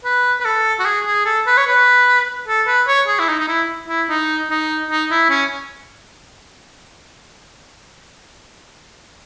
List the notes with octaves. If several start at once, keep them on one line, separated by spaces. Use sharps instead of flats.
B4
B4
A4
F#4
G#4
G#4
A4
B4
C#5
B4
A4
B4
C#5
G#4
E4
D#4
D#4
E4
E4
D#4
D#4
D#4
E4
C#4